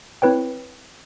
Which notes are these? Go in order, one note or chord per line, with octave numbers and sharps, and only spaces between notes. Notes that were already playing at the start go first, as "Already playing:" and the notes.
C4 E4 B4 C#5 G5